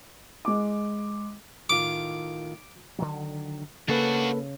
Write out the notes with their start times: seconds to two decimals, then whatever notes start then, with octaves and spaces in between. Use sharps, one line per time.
0.45 G#3 D6
1.70 A2 D#3 F4 D6
2.99 D3 D#3 F#3
3.88 C#3 A#3 D4 F#4 A4 B4